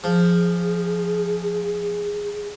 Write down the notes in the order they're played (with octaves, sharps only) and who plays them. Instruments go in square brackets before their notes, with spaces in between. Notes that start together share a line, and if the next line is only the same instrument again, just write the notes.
[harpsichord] F3 [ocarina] G#4